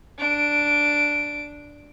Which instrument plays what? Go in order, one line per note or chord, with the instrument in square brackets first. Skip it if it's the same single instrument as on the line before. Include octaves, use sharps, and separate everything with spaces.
[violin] D4 D7